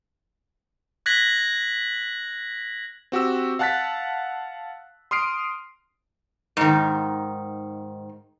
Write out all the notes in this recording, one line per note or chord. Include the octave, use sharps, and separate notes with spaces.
F#6 G#6 A#6 B6 F#7
C4 F#4 G4 E6
F5 F#5 A5 F#6 A6 B6
C6 D#6 F6 C7 D7
G#2 D#3